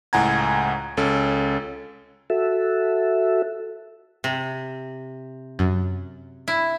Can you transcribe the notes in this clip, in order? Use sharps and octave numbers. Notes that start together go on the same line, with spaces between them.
C#2 A2 F#5 G#5 A#5 G#6
C#2 C#4 A4
F#4 A4 E5
C3
F#2
E4